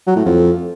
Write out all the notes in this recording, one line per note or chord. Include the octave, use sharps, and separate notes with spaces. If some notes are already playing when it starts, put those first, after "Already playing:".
F#3
A2
F2